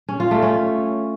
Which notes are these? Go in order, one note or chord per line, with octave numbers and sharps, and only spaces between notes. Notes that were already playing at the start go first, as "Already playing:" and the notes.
C#4
F4
A3
C#4